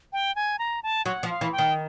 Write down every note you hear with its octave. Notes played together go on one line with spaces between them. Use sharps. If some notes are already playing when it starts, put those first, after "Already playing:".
G5
G#5
A#5
A5
F#3 F#5
F3
F5
E3
G5
D#3